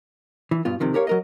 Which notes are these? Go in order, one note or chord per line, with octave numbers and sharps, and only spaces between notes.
E3
G2 B2 F4
C3 D#3 F3
G4 A#4 C#5 F5
F#3 A#4 D#5